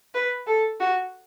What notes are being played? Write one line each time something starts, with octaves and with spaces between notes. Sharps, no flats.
B4
A4
F#4